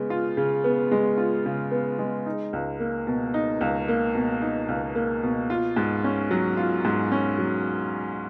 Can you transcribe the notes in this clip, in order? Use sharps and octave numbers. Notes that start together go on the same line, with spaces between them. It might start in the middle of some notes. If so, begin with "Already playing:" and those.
Already playing: C#3 G#3 B3
F4
C#3
B3
G#3
F4
C#3
B3
G#3
D#4
C#2
A#3
B2
D#4
C#2
A#3
B2
D#4
C#2
A#3
B2
F4
G#2
C#4
F#3
F4
G#2
C#4
F#3